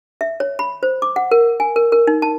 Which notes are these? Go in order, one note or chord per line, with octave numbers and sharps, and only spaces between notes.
E5
C#5
B5
C5
D6
F#5
A#4
G#5
A#4
A#4
D#4
A5